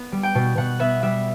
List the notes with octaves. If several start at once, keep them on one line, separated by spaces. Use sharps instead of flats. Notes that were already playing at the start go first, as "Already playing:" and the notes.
Already playing: B3
G3
G5
B2
B2 F#5
B3 E5
G3 E5